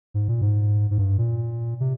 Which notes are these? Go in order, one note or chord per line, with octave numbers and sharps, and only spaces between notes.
G#2
A#2
G#2
G#2
G2
A#2
C3